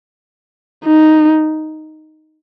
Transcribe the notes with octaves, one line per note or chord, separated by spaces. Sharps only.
D#4